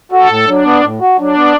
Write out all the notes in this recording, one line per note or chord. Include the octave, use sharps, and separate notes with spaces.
F#4 A4
A2
F#3 D4
B3
A2
F#4
F#3 D4
B3